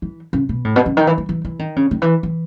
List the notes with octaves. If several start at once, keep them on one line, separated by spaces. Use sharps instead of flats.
E3
C#3
B2
A2
B2
C#3
D#3
E3
E3
E3
E3
D#3
C#3
D#3
E3
E3